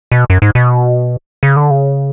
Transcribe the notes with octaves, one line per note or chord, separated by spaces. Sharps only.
B2
F#2
G#2
B2
C#3
D3
C#3